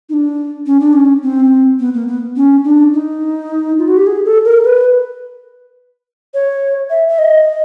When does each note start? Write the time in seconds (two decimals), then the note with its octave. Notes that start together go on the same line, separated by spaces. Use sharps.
0.09 D#4
0.13 D4
0.66 C#4
0.80 D4
0.93 C#4
1.23 C4
1.79 B3
1.94 A#3
2.08 B3
2.36 C#4
2.64 D4
2.93 D#4
3.78 F4
3.88 F#4
3.97 G4
4.07 G#4
4.25 A4
4.45 A#4
4.64 B4
6.34 C#5
6.90 E5
7.08 E5
7.18 D#5